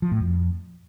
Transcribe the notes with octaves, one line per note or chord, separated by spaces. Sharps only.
F3
A2
F2